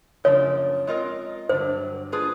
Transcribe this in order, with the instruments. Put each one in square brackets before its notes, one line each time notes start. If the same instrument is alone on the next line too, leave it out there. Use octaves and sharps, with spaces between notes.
[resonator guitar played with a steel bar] F#2 C#3 F3 A#3 D4 [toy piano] C#5
[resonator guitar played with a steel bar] G#3 C4 F4 A#4 D#5
[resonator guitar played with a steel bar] G2 D3 F#3 [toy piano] C5
[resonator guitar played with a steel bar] A#3 D4 F4 G#4 B4